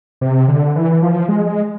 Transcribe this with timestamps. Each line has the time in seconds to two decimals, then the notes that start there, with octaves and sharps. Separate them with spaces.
0.21 C3
0.48 D3
0.76 E3
1.02 F3
1.28 G#3
1.46 G#3